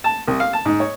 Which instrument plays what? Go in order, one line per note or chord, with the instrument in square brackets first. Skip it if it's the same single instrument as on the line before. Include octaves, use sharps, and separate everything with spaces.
[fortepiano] A5
C2
F5
A5
G#2
C#5